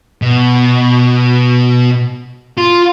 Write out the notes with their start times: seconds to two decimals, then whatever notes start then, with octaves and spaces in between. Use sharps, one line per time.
0.22 B2
2.58 F4